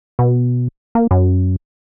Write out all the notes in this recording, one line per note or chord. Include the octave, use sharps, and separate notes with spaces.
B2
A#3
F#2